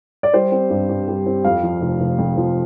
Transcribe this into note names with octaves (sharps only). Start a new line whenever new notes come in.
D5
G3 C5
C4
G2
G2
G3
C4
F2 F5
F3
F1
F1
F2
F3